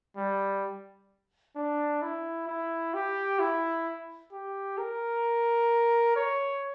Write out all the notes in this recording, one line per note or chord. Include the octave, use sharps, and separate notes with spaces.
G3
D4
E4
E4
G4
E4
G4
A#4
C#5